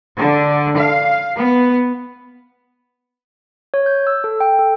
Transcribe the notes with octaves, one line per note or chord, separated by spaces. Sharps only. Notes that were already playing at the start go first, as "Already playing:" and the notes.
D3
F5
B3
C#5
G6
E6
A4
G5
A4